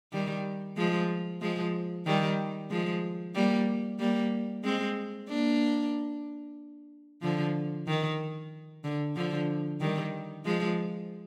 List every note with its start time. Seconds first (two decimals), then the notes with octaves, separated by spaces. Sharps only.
0.12 D#3 G3
0.77 F3 G#3
1.41 F3 G#3
2.06 D#3 G3
2.71 F3 G#3
3.35 G3 A#3
3.99 G3 A#3
4.64 G#3 C4
5.29 A#3 D4
7.22 D3 F3
7.88 D#3
8.84 D3
9.16 D3 F3
9.80 D#3 G3
10.45 F3 G#3